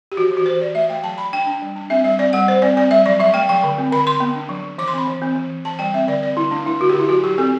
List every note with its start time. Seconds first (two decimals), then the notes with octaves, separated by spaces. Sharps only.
0.12 G4
0.17 E3 F#4
0.31 E3
0.37 F#4
0.46 E3 C5
0.61 E3 D5
0.75 A3 E5
0.90 A3 G5
1.03 F#3 A5
1.18 F#3 B5
1.33 D4 G5
1.46 D4
1.62 G3
1.76 D4
1.90 C4 E5
2.04 G3 E5
2.19 C4 D5
2.33 G3 F#5
2.47 G3 C5
2.62 C4 D5
2.77 C4 D5
2.91 G3 E5
3.06 F#3 D5
3.20 F#3 E5
3.34 A3 G5
3.49 F#3 G5
3.64 D3
3.78 C4
3.92 D3 B5
4.06 D3 C6
4.20 B3
4.35 D4
4.49 F#3
4.64 F#3
4.78 E3 D6
4.88 C6
4.93 C4 B5
5.08 E3
5.22 C4
5.36 E3
5.51 E3
5.65 E3 A5
5.79 G3 G5
5.94 C4 E5
6.08 D3 D5
6.23 C4 D5
6.37 D3 E4
6.51 A3 D4
6.66 A3 E4
6.80 D3 F#4
6.89 G4
6.94 D3
6.99 E4
7.09 F#3 F#4
7.24 F#3 G4
7.38 C4 A4